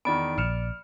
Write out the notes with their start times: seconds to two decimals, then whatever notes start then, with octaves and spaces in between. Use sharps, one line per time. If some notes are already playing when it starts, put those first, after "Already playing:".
0.05 E2 D#3 D5 B5 D7
0.38 A#1 F6 C#7 E7